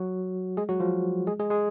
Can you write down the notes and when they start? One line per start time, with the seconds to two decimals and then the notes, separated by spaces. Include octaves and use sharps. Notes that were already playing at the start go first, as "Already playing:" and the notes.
Already playing: F#3 F#4
0.57 G#3 G#4
0.69 F#3 F#4
0.80 F3 F4
1.27 G#3 G#4
1.39 G#3 G#4
1.50 G#3 G#4